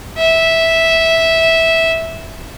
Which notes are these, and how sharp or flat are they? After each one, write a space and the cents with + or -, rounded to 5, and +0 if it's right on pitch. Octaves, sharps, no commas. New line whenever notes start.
E5 -10